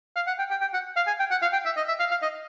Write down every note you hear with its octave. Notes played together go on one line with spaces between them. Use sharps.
F5
F#5
G5
G5
G5
F#5
F5
G#5
G5
F#5
F5
G5
E5
D#5
E5
F5
F5
D#5